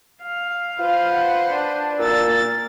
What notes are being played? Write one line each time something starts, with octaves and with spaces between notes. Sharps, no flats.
F5
F4 B4 C5
F#5
D4
A#2 E6 A6
A#3